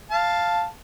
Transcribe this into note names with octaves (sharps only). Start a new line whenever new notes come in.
F5 A5